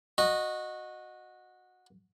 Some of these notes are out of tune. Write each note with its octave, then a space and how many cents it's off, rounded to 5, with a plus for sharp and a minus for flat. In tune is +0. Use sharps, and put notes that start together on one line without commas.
F#4 -15 D#5 -10